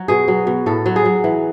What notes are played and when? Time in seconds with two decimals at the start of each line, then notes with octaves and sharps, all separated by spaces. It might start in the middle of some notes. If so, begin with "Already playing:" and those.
Already playing: F#3
0.08 B2 G#4
0.28 F#3
0.47 B2
0.66 A2 A4
0.86 F#3
0.96 G#4
1.06 F#3
1.24 E3